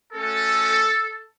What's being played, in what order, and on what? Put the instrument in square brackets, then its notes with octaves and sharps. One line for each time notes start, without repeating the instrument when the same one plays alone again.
[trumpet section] A3 C#4 F#4 A4